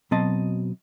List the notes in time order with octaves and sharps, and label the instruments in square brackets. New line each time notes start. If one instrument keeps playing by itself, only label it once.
[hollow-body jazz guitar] B2 F#3 C4 D#5 A5